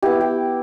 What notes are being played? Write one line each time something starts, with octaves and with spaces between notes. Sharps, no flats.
B3 E4 G4
G4